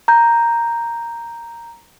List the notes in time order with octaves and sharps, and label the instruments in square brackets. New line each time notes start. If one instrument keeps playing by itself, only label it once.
[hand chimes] A#5 G6